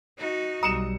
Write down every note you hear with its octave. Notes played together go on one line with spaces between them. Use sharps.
D#4 F#4
B1 G3 A#5 D#6 C#7 E7